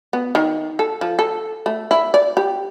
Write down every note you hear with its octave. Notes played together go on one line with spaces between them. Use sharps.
B3
D#3
A4
F3
A4
A3
E4
D5
G4